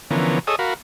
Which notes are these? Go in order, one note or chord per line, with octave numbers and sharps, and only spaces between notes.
D3 E3 F3 B3 C#4 A#4
G#4 A4 C#5 D#5 D#6 E6
F#4 A#4 F5 B5